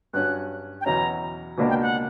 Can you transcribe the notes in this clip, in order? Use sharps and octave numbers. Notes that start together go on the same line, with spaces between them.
G2 F#3 C#4 F#6
G5
E2 B2 F#3 C#4 A#5
C#2 B2 A#3 D4
G5
F#5